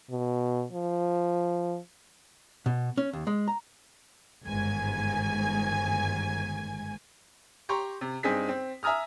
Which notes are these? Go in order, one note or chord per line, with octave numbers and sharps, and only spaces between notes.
B2
F3
B2
C#4
D#2
G#3
A#5
G1 G#2 D#3 G#5 G#6
G4 A#5 C6 C#6
C3
G2 C4 D#4 G#4 B6
C4
E5 G#5 A#5 D#6 F6